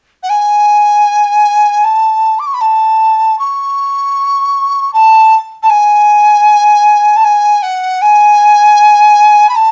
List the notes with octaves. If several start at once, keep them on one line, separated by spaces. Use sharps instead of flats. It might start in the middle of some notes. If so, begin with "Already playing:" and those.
F#5
G#5
A5
D6
C#6
B5
A5
C#6
A5
A5
G#5
A5
G#5
F#5
G#5
B5
A5